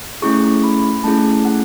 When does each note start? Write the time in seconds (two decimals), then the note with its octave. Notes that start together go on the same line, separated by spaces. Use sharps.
0.22 A3 C#4 E4 G#4 C#6
0.64 B5
1.04 A3 C#4 E4 G#4 A5
1.45 F#5